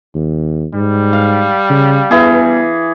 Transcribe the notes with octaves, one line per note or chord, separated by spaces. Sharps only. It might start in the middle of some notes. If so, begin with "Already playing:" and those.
D#2
G#2 G3
F5
C#3
E3 B3 G#4